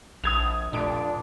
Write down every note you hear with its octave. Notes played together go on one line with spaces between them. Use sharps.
A#1 D#6 G#6 F7
F1 A#2 D4 D7